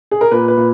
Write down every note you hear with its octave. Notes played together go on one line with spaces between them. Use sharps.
G#4
A#4
A#2 B4
B4
A#2